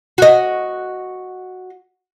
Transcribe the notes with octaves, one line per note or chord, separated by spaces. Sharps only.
F#4 D#5